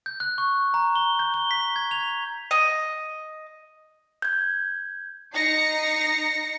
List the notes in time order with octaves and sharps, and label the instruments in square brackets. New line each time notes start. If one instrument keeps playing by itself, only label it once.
[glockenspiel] G6
F#6
C#6
A#5
G7
G6
G7
B6
G#6
F7
[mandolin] D#5
[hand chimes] G6 G#6
[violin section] D#4 A#6 C7 C#7